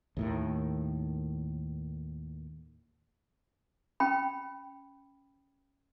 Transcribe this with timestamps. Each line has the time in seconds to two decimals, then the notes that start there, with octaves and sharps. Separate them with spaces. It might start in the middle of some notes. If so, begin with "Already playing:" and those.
0.17 D#2 A2 D#3
4.00 C#4 G5 B5